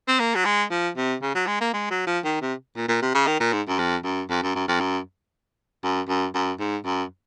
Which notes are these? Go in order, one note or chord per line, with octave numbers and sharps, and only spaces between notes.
C4
A#3
F#3
G#3
F3
C3
C#3
F#3
G#3
A#3
G#3
F#3
F3
D#3
C3
A#2
A#2
C3
C#3
D#3
A#2
G#2
F#2
F2
F#2
F2
F#2
F#2
F2
F#2
F#2
F#2
F#2
G#2
F#2